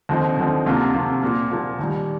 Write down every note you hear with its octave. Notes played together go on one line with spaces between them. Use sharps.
D#2 D3 F3 C4 D#4
D#2 D3 F3 C4 D#4
D2 C3 F3 A#3 F4
D2 C3 F3 A#3 F4
A#2 F3 A#3
A#2 F3 A#3
D#2 D#3 G3